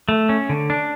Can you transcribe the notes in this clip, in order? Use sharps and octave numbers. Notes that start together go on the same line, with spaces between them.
A3
C#4
D3
D4